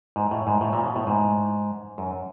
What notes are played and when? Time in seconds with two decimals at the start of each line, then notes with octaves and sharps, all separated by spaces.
0.16 G#2
0.31 A2
0.47 G#2
0.61 A2
0.73 A#2
0.84 B2
0.96 A2
1.07 G#2
1.98 F#2